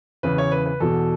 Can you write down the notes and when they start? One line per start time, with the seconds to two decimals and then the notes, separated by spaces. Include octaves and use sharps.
0.23 E2 C#3 E3 B4
0.38 C#5
0.52 B4
0.66 B4
0.80 E2 B2 A4